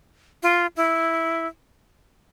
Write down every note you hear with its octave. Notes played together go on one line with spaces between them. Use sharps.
F4
E4